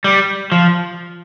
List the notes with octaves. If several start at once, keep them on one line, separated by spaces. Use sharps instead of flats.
G3
F3